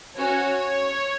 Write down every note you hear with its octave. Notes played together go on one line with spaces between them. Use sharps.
C#4 F#4 C#5